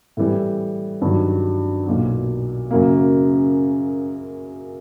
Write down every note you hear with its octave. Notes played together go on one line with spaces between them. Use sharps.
A2 E3 G3
G2 D#3 F#3
B1 A#2 F#3
F#2 C#3 F#3 A#3